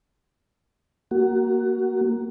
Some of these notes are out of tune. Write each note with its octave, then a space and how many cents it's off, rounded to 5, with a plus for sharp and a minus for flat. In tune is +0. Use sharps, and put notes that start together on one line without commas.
A#3 +5 F#4 +20